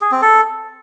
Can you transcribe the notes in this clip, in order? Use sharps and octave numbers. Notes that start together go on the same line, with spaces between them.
G#4
C4
A4